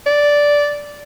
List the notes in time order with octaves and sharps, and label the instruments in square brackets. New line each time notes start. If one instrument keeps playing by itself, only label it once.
[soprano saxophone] D5